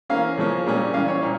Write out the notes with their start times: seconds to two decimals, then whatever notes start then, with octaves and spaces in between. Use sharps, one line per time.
0.10 E3 A#3 C#4 F5
0.37 C#3 F3 A#3 C#4
0.66 A#2 G3 A#3 C#4
0.94 E3 G3 C#4 F5
1.08 C#5
1.22 A#2